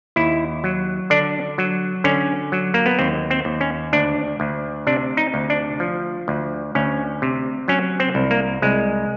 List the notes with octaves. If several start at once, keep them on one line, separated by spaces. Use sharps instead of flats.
D#2 E4
F#3
D3 D4
F#3
D3 C#4
F#3
A#3
B3
D#2 C4
C4
D#2
C#4
D2 D4
D2
C3 D4
D#4
D2
D4
F3
D2
D2 C#4
C3
F#3 C#4
C4
C2
A#3
C2 G#3